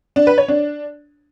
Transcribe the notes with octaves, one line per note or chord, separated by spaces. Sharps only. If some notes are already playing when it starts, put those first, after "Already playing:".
D4
B4
C#5
D4